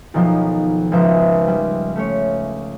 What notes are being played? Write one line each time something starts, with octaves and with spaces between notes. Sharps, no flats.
B1 D#3 F3
G#1 C#2 F3 E5
G3
A3 C#4 C#5